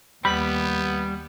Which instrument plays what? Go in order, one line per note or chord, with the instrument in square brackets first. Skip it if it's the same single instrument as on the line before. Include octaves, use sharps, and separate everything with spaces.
[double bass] D#2 [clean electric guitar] G3 [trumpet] B3 [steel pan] B5